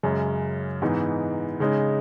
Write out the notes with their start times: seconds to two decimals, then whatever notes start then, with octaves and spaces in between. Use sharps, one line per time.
0.03 F#2 C#3 G#3
0.82 G#2 E3 B3 D#4
1.60 C#3 G#3 D#4